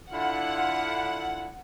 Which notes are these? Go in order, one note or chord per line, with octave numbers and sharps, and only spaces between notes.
D3 E4 F4 F#5